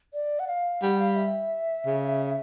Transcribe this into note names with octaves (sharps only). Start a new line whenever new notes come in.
D5
F#5
F5
G3 F#5
F5
E5
C#3